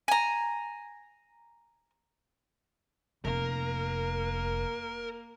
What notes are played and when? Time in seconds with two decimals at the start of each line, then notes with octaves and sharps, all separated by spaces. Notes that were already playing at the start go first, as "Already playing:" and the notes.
0.08 G#5 A#5
3.25 F1 A#3 A#4